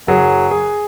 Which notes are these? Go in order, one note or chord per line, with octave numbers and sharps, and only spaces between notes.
F#1 F#3 G#4
G#4